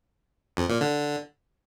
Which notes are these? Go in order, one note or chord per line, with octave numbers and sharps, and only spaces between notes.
F2
A#2
D3